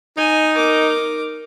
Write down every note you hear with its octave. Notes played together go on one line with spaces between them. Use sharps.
D#4 G#5
A#4 D6